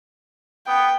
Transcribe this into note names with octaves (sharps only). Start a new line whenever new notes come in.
B3 G5